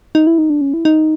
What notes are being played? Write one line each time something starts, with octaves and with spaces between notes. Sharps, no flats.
D#4
E4
D#4
D4
C#4
E4
D#4